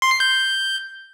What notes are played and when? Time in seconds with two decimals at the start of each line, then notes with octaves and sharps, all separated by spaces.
0.02 C6
0.11 C7
0.20 G6